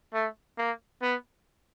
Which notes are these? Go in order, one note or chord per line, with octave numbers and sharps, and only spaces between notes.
A3
A#3
B3